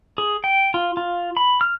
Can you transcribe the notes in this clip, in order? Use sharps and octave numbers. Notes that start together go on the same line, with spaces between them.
G#4
G5
F4
F4
B5
F6